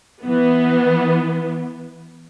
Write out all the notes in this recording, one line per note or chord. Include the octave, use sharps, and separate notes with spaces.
E3 B3